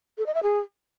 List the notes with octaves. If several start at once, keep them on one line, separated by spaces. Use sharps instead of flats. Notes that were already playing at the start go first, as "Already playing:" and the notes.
A4
D#5
E5
G#4